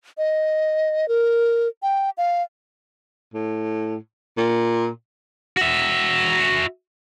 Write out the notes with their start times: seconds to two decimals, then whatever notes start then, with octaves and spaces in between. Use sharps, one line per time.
0.18 D#5
1.08 A#4
1.83 G5
2.18 F5
3.34 A2
4.37 A#2
5.57 F#4 E5